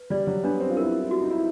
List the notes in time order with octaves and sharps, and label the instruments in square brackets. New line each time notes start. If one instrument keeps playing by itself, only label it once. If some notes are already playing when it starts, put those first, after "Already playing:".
Already playing: [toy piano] B4
[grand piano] G3 [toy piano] D5
[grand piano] F#3
[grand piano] B3 [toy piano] D4
[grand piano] C4
F4
[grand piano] E4 [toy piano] A#4
[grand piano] E4
[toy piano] F#4
[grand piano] D#4
E4